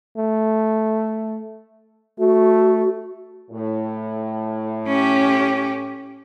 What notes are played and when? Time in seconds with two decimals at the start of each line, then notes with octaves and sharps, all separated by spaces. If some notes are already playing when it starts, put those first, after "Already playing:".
0.17 A3
2.19 A3 F#4
3.51 A2
4.87 C#4 G4